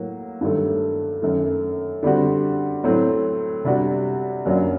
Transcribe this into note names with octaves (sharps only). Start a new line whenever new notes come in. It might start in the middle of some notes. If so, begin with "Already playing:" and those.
Already playing: A2 F#3 A#3 F#4
G2 D#3 F#3 A3
F#2 D#3 A3
D3 G3 C4 F#4
A2 F#3 A3 C4
C3 G3 D4 F#4
F#2 F#3 A#3 D4 F#4